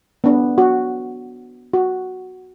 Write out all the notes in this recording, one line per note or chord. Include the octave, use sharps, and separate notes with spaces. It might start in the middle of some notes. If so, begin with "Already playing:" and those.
B3 D4
F#4
F#4